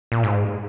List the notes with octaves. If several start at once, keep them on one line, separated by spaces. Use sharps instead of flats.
A#2
G#2